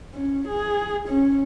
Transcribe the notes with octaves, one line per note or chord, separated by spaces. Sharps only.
C#4
G#4
C#4